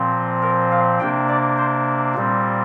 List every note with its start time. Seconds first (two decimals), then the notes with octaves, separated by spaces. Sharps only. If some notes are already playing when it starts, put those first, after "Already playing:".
Already playing: A#2 F3 C4
0.42 A#4
0.72 F5
1.00 C3 A#3 D4 G5
1.28 D5
1.58 C5
2.15 A#2 G3 C4